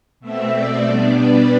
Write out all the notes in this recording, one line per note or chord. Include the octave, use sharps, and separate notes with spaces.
B2 A3 C4 E5
D5
B2 G3 B3 D4
B4